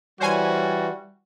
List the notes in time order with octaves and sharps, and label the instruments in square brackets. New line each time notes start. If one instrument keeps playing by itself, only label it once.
[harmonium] E3 [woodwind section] G3 [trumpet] F#4 [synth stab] C5 C#5 G#5